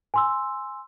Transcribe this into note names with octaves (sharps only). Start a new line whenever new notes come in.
G#5 C6 E6